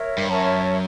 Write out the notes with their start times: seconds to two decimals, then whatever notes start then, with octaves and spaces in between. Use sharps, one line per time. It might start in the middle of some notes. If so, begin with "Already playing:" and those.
Already playing: A#4 C#5 E5
0.18 G2
0.29 F#2 A#4 C#5 E5 A5